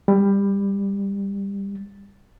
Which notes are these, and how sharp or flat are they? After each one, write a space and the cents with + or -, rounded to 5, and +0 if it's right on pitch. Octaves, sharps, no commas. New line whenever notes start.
G3 +20